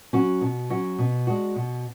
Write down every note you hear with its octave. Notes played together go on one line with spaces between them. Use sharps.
F#3 C#4 F#4
B2
F#3 C#4 F#4
B2
G#3 D4 F#4
B2